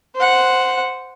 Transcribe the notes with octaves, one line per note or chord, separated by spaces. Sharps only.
C5 F#5